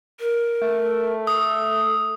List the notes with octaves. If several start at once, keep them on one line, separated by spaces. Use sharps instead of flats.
A#4
A3
A4 D#6